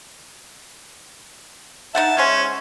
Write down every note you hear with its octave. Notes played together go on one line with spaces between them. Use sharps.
D#4 A4 E5 F#5 A5
G#3 C#4 C5 G#5